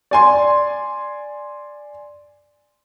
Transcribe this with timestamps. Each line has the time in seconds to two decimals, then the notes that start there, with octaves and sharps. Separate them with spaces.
0.11 D5 G#5 C6